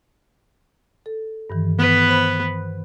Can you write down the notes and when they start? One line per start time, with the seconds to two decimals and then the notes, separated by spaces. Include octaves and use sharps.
1.06 A4
1.50 G2 D#3 E3
1.78 B3 B4
2.08 C5 B5